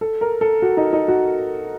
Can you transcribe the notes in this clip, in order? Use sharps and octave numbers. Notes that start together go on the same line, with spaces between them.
A4
A#4
A4
F#4
D#4
D#4
F#4